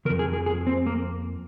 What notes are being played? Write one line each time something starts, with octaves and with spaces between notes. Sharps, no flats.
D#3 A#4
F2
G#4
G#4
G#4
C4
A#3